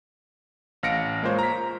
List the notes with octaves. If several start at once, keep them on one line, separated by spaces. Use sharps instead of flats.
A1 F5 F6 A#6 C#7 D7
G#3 A#3 F4 C5 C#5
A#5 B6